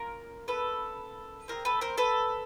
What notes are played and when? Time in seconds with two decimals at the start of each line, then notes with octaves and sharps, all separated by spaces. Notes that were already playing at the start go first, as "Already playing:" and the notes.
Already playing: A#3 C#4 F4 A#4
0.48 A4 B4
1.48 C4 F4 G#4 A#4
1.65 A4 B4
1.81 A#4 C5
1.98 A4 B4